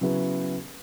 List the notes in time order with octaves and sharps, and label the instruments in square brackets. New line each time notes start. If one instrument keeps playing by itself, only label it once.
[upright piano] C#3 F#3 B3 E4 G#4